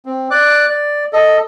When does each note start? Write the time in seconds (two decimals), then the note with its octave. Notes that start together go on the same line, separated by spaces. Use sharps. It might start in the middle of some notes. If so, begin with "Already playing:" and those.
0.06 C4
0.31 D5 D6 F#6
0.67 D5
1.13 A4 D#5